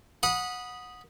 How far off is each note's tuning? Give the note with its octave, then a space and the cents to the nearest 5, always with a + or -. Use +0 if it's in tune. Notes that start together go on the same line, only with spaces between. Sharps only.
F#5 -20 B5 -15 D#6 +0